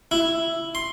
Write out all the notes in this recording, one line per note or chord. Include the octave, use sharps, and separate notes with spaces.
E4
C6